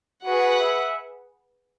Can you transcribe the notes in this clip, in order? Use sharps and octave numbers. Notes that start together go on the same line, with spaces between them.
F#4 G#4 B4 F#5
E5